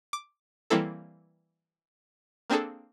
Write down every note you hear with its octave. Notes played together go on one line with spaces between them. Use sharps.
D6
E3 G3 A#3 C4 E4 A4
A#3 C4 D4 G#4 A4